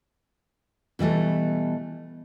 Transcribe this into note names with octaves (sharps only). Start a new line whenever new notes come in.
B2 E3 G3 A3